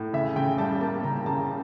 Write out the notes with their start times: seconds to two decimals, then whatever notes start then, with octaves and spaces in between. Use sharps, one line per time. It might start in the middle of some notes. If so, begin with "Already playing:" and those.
Already playing: A2
0.13 C#3 E5
0.36 C#3 G5
0.58 G3 A5
0.81 A#3 A5
1.03 C#3 A#5
1.26 C#3 A5